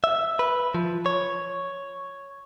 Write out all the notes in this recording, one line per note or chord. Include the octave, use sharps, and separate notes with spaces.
E5
B4
F3
C#5